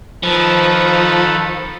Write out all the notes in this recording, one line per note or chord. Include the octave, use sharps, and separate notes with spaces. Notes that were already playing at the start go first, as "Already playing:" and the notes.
D#3 F3 A4 B4